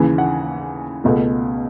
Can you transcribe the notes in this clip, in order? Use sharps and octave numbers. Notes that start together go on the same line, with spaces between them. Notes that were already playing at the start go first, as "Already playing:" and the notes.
Already playing: D#2 C#3 E3 G#5
F#5
C#2 B2 A3